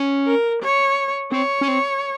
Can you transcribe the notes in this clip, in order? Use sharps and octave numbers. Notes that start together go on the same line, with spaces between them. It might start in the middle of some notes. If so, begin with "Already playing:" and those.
Already playing: C#4
A#4
C#5
C4 C#5
C#4
C4